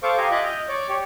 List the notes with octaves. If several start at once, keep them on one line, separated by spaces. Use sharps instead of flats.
A4 C5 F5 C#6 D6
G4 F5 G#5 A#5 C6 D#6
F4 D#5 E5 G#5 D6 F#6
D#5 F6 G6
C#5 D5 D6
G4 C#5